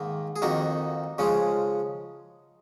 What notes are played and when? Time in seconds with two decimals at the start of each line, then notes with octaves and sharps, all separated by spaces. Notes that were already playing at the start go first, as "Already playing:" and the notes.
Already playing: G#2 D#3 A#3
0.36 G#4
0.42 F2 D#3 A#3 D#4 F#4
1.18 C#3 F3 G#3 C#4